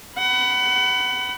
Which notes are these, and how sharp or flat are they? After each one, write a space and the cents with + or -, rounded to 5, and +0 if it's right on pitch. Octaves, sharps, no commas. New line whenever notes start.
F#5 +30 B5 +0